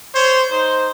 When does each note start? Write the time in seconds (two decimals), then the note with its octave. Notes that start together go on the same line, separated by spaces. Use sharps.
0.13 C5 C#5
0.50 D#4 C5